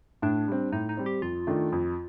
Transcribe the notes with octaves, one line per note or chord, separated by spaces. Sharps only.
A2 D4
G3 C4
A2 D#4
D#4
G3 C4
G4
F2 F4
D#3 A3 D4
F2